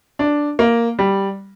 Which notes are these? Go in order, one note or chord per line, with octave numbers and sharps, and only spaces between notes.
D4
A#3
G3